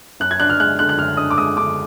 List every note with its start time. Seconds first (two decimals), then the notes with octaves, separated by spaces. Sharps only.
0.20 F#2 F#6
0.31 G#6
0.40 D4 F#6
0.50 F6
0.60 G#3 F#6
0.79 D3 F#6
0.89 F#6
0.98 F#2 F6
1.17 D4 D#6
1.30 D6
1.38 G#3 D#6
1.56 D3 D6